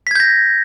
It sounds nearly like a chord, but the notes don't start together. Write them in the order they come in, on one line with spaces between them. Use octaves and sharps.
B6 G#6 G6 A#6